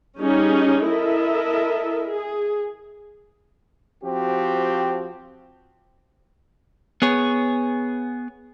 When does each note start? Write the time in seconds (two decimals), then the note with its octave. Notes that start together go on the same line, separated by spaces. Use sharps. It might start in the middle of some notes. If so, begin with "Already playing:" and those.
0.18 G3 C#4 D#4 G4 G#4
0.87 E4 A4 A#4 D#5 E5
2.08 G#4
4.04 F3 C4 F#4 G4
7.02 B3 G#4 C#5